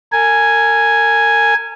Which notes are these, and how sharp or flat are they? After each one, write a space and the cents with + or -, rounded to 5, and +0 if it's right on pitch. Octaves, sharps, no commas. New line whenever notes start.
A#4 -35 G#5 +0